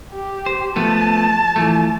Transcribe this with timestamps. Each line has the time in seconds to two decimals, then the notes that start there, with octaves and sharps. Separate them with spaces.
0.12 G4
0.46 C5
0.76 F3 A3 B3 A5
1.56 E3 F3 A3